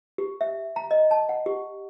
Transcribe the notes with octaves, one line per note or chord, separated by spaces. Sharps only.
G4
E5
A#5
D#5
A5
F#5
G4